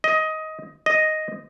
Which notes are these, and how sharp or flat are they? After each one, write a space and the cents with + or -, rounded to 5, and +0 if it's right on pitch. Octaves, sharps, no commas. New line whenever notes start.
D#5 +15
D#5 +0